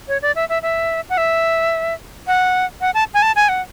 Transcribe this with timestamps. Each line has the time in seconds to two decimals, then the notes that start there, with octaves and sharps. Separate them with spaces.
0.08 C#5
0.22 D5
0.35 E5
0.49 E5
0.62 E5
1.10 F#5
1.17 E5
2.27 F#5
2.81 F#5
2.94 A5
3.14 G#5
3.22 A5
3.36 G#5
3.49 F#5